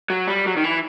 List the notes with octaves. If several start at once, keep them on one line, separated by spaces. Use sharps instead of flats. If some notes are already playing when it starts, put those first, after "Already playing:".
F#3
G3
F#3
D#3
E3